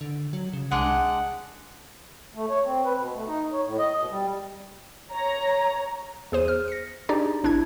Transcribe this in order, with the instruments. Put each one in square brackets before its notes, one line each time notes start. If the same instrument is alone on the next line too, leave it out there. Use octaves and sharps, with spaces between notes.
[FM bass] D3
F#3
C#3
[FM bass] C2 [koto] G#3 D4 [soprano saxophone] F#5
[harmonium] A3
C#5
C4
B4
B2
A3
D#4
C#5
A2
D#5
B2
G3
[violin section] C#5 A#5
[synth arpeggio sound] E2 G#4 C5 D#7
F6
A#6 C#7
D4 D#4 G4 G#4 D5 A#5
G#1 D4 E4 G#6